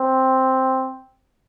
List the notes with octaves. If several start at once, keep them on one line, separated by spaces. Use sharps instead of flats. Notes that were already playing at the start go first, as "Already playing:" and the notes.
Already playing: C4